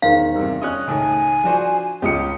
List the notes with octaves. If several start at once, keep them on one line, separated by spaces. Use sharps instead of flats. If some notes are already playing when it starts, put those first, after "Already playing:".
E1 D#3 C5 F5
E2 G2 C3
C#4 D#5 D#6 F#6
C#2 A2 D#3 G#5
F3 D4 F#4 C5
C#2 C#3 F4 G4 D#6 C#7